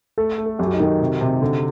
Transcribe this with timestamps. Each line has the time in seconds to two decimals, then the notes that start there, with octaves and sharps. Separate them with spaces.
0.18 A3 A4
0.38 A3
0.46 A4
0.59 F#2 G4
0.67 F#4
0.73 D#4
0.80 D#3
1.01 C3
1.21 C3
1.42 D3